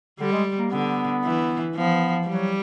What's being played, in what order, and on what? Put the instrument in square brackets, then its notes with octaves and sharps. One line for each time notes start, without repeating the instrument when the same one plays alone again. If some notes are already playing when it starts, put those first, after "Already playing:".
[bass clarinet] D3 [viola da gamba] G3
[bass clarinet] G#3
A#3
[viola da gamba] D3 [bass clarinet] B3
[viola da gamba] E3
[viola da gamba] F3 [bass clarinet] B3
[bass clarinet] F#3 [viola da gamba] G3